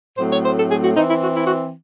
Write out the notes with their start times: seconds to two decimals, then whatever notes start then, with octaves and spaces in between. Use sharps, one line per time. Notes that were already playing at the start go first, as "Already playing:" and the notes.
0.18 A2 F#3 A3 C4 C5
0.31 C#5
0.44 C5
0.57 A4
0.70 G#4
0.83 F#4
0.95 E3 C4 D#4
1.08 E4
1.22 F#4
1.35 E4
1.47 F#4